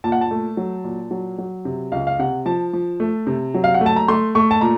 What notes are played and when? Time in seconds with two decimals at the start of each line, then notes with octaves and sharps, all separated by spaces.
0.04 A#2 A5
0.12 F#5
0.21 A5
0.31 A3
0.57 F#3
0.84 A#2
1.11 F#3
1.38 F#3
1.65 C3
1.92 C#2 F5
2.07 F5
2.19 C3 F#5
2.46 F3 A5
2.73 F3
3.00 A3
3.27 C3
3.54 F#3
3.64 F5
3.74 F#5
3.81 A3
3.86 A5
3.96 A#5
4.08 A3 C6
4.35 A3 C#6
4.51 A5
4.61 A#2 A#5